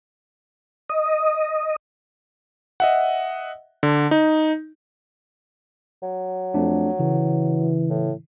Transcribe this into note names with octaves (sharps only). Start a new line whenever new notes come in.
D#5
D#5 E5 F#5
D3
D#4
F#3
F2 A3 D4
C#3 E3
A2